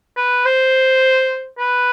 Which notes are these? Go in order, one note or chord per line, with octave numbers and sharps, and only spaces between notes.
B4
C5
B4